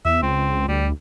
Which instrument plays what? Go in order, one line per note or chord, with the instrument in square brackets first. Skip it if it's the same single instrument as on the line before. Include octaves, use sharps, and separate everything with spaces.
[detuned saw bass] E2 [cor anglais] E5
[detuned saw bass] C#2 [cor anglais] C4
[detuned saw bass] D2 [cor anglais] G3